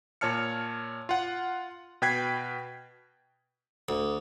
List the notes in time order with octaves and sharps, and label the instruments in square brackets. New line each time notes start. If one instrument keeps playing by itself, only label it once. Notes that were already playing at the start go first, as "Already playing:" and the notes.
[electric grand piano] A#2 C#5 A5 F6 C#7
F4 F#5
B2 B4 G5 G#6 B6 C7
[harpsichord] D2